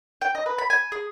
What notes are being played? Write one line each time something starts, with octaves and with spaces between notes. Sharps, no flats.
G5
D#5
B4
B5
G#5
G#4